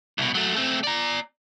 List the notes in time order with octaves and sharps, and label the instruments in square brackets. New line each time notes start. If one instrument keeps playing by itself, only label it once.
[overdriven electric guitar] C2 B2
F#3 A3
A3 C4
D5 A#5